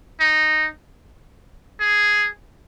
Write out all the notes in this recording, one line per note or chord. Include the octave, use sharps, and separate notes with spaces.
D#4
G#4